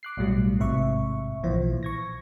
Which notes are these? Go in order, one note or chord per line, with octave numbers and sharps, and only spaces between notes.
D6 F#6 C7
B1 A2 F#3 G3
A1 G#2 C3 E5 C#6
B1 A#2 E3 F3 C5
C#6 G#6 A#6